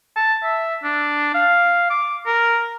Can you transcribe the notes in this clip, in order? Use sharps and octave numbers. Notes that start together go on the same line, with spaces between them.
A5
E5
D4
F5
D6
A#4